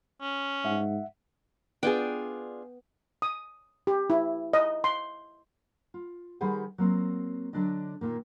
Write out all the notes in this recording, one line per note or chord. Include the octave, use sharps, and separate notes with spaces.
C#4
G#2 E5 F#5
B3 D4 F4 G#4 G5
D#6
G4
E4
D#5
C6
F4
D#3 G3 G#4 B4 C5 F#5
F#3 A#3 C4
D3 F#3 D4 D5 D#5
A#2 D#3 A#3